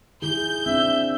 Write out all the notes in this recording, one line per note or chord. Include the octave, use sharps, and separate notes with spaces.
D#3 E4 G#4 G6
C4 D4 E5